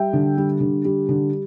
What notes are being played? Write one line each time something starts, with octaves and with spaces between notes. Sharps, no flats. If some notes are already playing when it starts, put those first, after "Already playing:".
Already playing: G3 E5 G5
D3
G3
D3
G3
D3